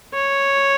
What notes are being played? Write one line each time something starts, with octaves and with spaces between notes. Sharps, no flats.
C#5